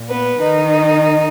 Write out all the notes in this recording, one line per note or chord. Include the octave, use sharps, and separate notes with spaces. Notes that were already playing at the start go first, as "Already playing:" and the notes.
Already playing: A#2
B3 B4
D#3 D#4